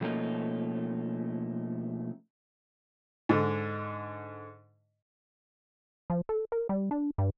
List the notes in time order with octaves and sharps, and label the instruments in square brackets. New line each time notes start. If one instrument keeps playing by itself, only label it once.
[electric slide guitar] B2 F3 A3 A#3 C#4 D#4
[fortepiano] G#2 D3
[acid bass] F3
A4
A#4
G3
D4
G2